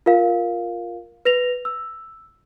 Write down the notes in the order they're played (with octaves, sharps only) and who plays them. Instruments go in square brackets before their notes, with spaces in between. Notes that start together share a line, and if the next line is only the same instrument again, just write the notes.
[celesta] F4 A#4 F5
B4 A#6 F7
E6